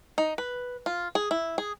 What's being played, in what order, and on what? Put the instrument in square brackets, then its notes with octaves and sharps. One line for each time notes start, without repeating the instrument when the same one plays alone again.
[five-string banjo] D#4
B4
F4
G#4
E4
G#4